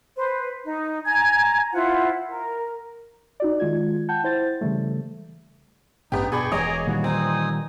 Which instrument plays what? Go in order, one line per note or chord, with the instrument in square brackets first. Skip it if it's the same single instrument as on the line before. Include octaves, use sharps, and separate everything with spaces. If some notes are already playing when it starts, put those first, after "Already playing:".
[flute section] B4 C5
D#4
G#5 A#5 G#6
E4 F4 C5 F#5
A#4
[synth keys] D#4 F#4 D5
D#3 G#3 F4 G#6
F#5 G5 A5 G6
E4 C5 G6 A6
C#3 E3 G3 A3
[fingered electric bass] A1 [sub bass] G2 [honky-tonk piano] B3 G4 [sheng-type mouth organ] D#4
[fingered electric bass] B2 [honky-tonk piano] G#4 D5 B5 [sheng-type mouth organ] G5 C#6
[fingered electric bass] E1 [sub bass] E3 [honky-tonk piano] G#4 C#5 D#5 [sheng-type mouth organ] G#5 A#5 D6
[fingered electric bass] A#2 D#3 G3 [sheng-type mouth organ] F#4
[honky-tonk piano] C4 [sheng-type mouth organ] D#4 G#5 D#6